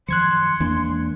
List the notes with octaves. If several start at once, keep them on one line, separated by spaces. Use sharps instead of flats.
F#2 D#3 F3 C6 F#6 G#6 C#7
E2 E3 G#3 A#3 D4